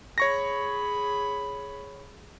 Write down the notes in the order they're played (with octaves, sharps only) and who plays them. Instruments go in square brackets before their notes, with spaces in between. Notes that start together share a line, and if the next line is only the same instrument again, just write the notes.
[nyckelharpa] G#4 B5 [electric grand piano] C#5 C#6 A#6